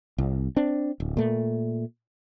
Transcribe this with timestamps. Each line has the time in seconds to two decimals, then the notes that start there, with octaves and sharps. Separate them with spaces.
0.18 C2
0.56 C4 D4
1.00 D1
1.17 A#2 A3